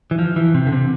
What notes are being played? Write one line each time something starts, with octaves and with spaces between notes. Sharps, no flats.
E3
F3
E3
C3
D3
C3